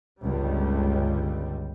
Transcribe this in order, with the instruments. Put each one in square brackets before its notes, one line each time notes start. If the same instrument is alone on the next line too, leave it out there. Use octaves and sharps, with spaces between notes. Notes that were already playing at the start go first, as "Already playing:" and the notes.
[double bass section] G1 C#2 G3